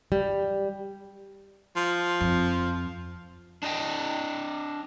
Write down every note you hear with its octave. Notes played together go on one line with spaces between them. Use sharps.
G3
F3
F2
D4 D#5 G5